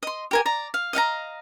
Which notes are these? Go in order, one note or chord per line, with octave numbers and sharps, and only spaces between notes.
D#5 C6
G4 A#4 G#5
D5 A#5
F5
D#5 F5 F#5 A#5